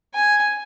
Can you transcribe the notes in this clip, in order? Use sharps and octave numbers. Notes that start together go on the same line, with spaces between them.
G#5